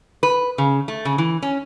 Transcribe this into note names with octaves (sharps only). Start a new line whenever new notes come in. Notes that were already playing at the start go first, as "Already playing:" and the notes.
B4
C#3
A3
C#3
E3
C#4